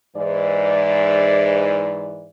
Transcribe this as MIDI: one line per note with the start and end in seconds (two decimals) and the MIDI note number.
0.16 2.30 44
0.16 2.30 52
0.16 2.30 74